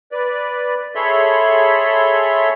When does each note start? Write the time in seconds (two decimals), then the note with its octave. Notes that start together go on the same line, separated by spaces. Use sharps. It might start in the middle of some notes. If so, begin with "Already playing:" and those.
0.12 B4 D5
0.95 G#4 A4 C#5 E5 B5 C6